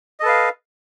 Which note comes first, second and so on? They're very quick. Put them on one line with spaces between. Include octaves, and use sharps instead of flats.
D#5 A4 B4 F5